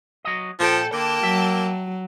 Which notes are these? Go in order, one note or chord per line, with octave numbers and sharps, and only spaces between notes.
F#3 D#5
A#2 F3 A4 G5
D3 A#3 G5 A5
F#3 E5